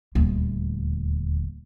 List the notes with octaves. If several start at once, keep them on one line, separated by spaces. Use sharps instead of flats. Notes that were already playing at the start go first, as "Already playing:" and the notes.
D#1 D2